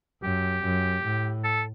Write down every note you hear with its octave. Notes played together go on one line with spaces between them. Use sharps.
F#2 G4
F#2
A2
A4